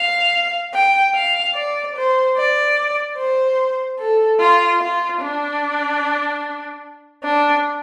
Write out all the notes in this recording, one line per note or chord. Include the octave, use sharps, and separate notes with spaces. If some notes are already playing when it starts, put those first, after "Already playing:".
Already playing: F5
G5
F5
D5
C5
D5
C5
A4
F4
F4
D4
D4